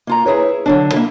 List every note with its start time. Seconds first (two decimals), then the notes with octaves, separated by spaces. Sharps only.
0.07 A#3 F4 A#5
0.26 E4 G#4 B4 C#5
0.66 D3 F#3 D4
0.93 A#3 E4